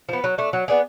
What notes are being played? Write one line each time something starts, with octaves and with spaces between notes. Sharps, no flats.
F3 B3
F#3
A3 D4
F#3
B3 D4 G#4